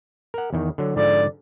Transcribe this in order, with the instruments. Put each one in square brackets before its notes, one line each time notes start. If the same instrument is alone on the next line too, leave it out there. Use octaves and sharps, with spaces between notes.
[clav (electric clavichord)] A#4 F#5
E2 D#3
D3 F#3
[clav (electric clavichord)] G#2 D3 F3 [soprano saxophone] D5